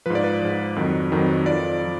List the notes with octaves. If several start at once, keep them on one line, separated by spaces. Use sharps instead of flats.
G#2 F3 B4
D5
B4
G#2 F3
F2 D#3 F#3
F2 D#3 F#3
F2 F3 D5
F3